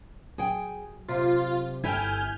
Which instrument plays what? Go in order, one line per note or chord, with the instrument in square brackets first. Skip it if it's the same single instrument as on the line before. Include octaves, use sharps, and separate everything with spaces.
[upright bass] F#3 [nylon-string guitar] G#4 G5
[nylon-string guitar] C3 [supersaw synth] F4
[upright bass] G1 [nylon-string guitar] E4 A4 G5 [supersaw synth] G#5 F6 G6